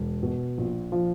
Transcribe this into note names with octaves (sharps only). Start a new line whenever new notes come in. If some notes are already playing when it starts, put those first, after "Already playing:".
Already playing: E1
B2
A#1
F3